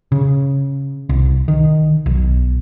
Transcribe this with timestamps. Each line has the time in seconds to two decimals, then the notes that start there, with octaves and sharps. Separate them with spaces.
0.12 C#3
1.09 C2
1.48 D#3
2.06 B1